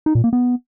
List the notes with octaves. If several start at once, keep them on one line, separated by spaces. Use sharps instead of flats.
D#4
A#2
A#3
B3